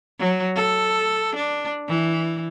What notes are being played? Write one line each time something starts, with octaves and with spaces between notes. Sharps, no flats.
F#3
A4
D4
E3